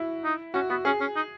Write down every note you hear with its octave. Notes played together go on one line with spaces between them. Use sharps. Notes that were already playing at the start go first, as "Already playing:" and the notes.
Already playing: E4 F#4
D#4
C#4 F#4
B3 F#4
C#4 G#4
C#4
D#4